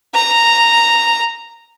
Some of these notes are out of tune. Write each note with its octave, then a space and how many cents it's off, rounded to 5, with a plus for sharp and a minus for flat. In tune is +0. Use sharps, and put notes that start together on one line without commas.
A#5 -5